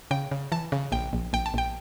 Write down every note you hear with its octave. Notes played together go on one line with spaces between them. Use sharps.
C#3 G5
C#3
E3 A5
C#3
A#1 G5
A#1
A#1 G5
A5
A#1 G5